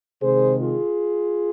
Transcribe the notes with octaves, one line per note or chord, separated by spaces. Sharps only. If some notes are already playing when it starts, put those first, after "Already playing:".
C3 D#3 G#3 G#4 C5
F4 G#4